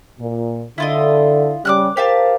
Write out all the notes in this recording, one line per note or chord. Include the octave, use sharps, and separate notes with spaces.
A#2
D3 E4 F4 D#5
C#3 G3 D6 F6 F#6
G4 A#4 C5 F5 A5